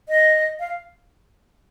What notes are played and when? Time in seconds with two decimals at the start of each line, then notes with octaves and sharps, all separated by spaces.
0.09 D#5
0.60 F5